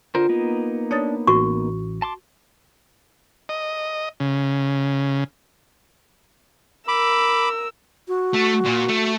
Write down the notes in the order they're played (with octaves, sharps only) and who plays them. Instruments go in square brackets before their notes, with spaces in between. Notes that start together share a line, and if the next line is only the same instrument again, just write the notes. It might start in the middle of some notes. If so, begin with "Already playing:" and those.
[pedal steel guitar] D3 A#4 C5 [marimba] F4
[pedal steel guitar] A#3 B3 D#4
[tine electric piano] D4 [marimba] C#5 D#6 A6
[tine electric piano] A1 [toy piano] F#4 C#6
[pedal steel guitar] A5 C6 D6
[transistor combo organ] D#5
C#3
[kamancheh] A#4 E6 [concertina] B5 D6
[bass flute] F#4
[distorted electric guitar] A3
A#2
A3